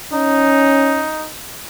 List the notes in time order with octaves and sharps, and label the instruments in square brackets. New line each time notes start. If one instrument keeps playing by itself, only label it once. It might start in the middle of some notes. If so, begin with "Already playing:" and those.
[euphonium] C#4 [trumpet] D#4